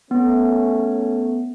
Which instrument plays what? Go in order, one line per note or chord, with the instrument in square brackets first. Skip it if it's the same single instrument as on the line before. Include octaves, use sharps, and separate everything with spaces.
[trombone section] A3 C#4 [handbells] B3